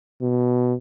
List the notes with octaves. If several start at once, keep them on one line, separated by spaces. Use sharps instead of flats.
B2